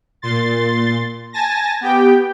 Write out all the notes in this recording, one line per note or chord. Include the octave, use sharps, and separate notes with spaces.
A#2 C6 A6
G#5 A5 A6 A#6
B3 G4 G5